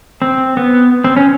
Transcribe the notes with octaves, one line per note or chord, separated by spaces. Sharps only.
C4
B3
C4
C#4